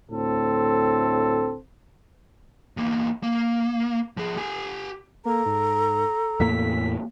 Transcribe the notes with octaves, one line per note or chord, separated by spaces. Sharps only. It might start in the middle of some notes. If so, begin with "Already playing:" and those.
D2 A2 C4 A4
E2 A#3
A#3
F3 G#4
G4 G#5
A#3 A4 A#5
G#2
E2 A2 A#3 B6